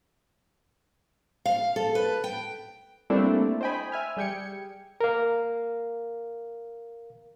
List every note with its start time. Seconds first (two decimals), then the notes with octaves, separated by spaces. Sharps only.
1.46 F5
1.76 A4
1.95 B4
2.24 G5
3.10 G3 A3 A#3 C4 D4 E4
3.61 C5 D#5 G5 G#5 B5
3.92 E5 G#5 F6
4.17 G3 G#4 G5 G#6 C#7
5.01 A#4 F5